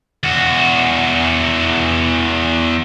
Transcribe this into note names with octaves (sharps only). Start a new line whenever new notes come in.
E2 F#4